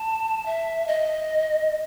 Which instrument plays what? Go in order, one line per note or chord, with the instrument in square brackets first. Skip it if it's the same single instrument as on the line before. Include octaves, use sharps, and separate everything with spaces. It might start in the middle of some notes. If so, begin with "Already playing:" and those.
Already playing: [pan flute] A5
E5
D#5